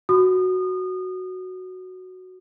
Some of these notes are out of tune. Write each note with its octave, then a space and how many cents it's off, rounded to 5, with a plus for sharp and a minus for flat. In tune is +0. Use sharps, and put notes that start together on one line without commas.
F#4 +0 D#6 -30